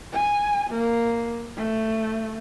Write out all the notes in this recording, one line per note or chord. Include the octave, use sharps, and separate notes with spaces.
G#5
A#3
A3